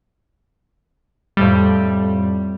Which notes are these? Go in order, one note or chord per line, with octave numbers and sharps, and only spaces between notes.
F2 A2 G3